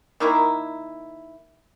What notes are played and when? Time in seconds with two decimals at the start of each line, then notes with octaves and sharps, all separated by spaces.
0.20 D#3 A#3 E4